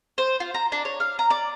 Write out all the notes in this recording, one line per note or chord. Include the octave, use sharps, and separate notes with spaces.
C5
F4
A#5
D4
C#5
F5
A#5
D5